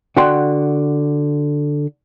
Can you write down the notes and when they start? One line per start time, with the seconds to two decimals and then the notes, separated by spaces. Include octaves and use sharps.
0.17 D3 F#4 F#5 G5 C6